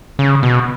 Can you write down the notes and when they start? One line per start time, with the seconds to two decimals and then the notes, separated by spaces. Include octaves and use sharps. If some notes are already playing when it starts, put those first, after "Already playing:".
0.19 C#3
0.43 B2